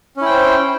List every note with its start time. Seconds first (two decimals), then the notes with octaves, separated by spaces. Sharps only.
0.17 C#4
0.21 E4
0.26 G5
0.30 C5